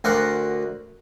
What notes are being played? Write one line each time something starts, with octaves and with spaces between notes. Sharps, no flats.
D2 A#4 C5 D5 F#5